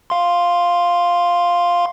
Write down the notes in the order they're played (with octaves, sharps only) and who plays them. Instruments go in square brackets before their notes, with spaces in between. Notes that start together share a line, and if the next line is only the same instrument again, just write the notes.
[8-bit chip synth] F5 C6